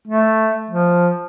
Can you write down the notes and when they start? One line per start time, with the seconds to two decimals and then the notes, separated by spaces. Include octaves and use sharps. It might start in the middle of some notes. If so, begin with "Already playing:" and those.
0.07 A3
0.70 F3